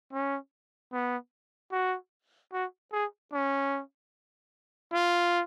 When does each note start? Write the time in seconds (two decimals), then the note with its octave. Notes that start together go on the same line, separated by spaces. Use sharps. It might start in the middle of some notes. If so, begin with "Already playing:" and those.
0.13 C#4
0.93 B3
1.72 F#4
2.53 F#4
2.92 G#4
3.33 C#4
4.93 F4